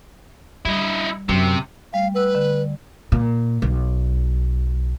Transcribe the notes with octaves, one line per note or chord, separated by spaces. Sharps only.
G3 D#4 E4
F#2 C3
G3 A3 F5
B4 F#5 E6
D3
A#2
B1